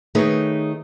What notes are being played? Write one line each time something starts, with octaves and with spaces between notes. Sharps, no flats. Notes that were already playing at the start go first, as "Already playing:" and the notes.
D#3 A3 D#4 G#4 B4 C#5